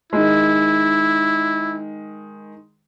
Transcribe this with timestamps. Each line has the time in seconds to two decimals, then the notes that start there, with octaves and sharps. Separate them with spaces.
0.13 D#3 G#3 E4